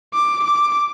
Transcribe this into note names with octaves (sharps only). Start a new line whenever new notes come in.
D6
D6